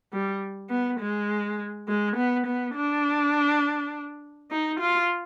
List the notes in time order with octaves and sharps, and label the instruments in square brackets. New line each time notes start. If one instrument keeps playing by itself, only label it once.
[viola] G3
B3
G#3
G#3
B3
B3
D4
D#4
F4